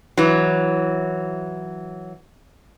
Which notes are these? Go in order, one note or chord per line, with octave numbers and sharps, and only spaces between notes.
E3 F#3